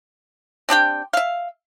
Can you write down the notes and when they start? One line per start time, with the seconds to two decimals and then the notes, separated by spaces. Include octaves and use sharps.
0.69 C4 D4 G4 G5
1.13 E5 F5